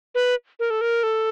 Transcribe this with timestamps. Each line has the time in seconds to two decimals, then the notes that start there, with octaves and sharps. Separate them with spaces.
0.15 B4
0.60 A#4
0.70 A4
0.81 A#4
1.03 A4